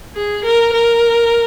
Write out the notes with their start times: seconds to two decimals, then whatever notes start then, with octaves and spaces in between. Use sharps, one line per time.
0.16 G#4
0.45 A#4
0.73 A#4